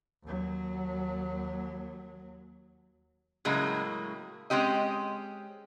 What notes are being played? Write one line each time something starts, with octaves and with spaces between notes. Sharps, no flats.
D#2 F#3
A2 C#3 F#3 G#3 A#3
G#3 C4 C#4 G4 D#5